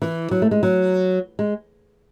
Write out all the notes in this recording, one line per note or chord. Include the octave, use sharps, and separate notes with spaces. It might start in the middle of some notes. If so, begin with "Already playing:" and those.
E3
F#3
A3
G#3
F#3
G#3